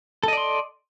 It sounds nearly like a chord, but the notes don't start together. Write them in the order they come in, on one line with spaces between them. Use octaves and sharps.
A4 D#5 D5 C6